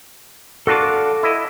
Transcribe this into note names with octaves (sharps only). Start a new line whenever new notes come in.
D4 F4 F#4 A4 D6
E4 D#5